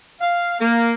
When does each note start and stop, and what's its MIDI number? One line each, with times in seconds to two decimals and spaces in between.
0.21 0.59 77
0.60 0.94 58